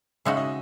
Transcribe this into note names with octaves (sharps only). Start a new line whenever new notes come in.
C#3 G#3 D#4 F#4 E5
D#5